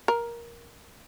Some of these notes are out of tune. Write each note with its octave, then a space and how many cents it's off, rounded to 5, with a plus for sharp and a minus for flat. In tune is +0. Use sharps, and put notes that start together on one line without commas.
A#4 +10